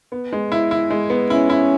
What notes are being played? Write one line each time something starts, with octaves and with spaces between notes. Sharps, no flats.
B3
G#3
E4
E4
G#3
B3
C#4 E4
E4